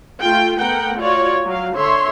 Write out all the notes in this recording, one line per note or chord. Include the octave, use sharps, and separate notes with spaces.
A3 F4 G5
A3 B3 A#4 F#5 G5
F4 F#4 C#5 D5
F#3 F5
D3 C#5 E5 C6